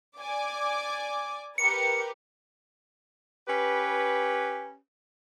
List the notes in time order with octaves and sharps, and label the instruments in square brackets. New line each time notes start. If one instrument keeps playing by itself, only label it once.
[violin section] D5 G#5 D6
[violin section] G4 A#4 B4 [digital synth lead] C#7
[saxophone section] C#4 G4 B4